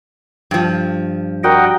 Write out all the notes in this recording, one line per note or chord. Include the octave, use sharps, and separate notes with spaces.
G2 F3
G3 F#4 A#4 D#5 F#5 G5